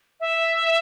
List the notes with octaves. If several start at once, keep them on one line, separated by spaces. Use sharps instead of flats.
E5